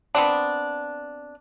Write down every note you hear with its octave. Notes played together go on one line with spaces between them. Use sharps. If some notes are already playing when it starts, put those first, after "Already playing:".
B3 C4 D4